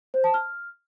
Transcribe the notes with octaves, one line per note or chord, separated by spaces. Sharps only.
C5
A5
F6